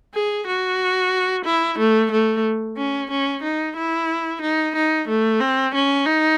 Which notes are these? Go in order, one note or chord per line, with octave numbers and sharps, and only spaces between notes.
G#4
F#4
E4
A3
A3
C#4
C#4
D#4
E4
D#4
D#4
A3
C4
C#4
D#4